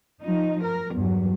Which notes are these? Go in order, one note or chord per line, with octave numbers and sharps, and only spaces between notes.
F3 D#4
A#4
E2 G2 F#3